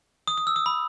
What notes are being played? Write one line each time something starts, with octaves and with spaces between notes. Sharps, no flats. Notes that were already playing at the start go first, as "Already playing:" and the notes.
D#6
D#6
E6
D#6
B5